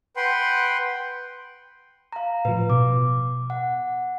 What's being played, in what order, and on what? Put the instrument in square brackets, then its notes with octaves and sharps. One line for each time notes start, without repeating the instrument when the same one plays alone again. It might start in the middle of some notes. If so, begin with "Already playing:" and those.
[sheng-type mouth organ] B4 F#5 G5 C6
[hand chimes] F5 A#5
[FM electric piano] A2 F3 [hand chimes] B4
[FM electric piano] B2 [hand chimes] D6
[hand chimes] F#5